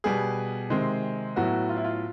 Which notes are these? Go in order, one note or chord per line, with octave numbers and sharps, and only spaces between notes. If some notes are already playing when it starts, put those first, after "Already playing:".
B2 G3 B3 G#4
C3 D#3 G#3 C4
A2 F#3 B3 F#4
F4
E4
F4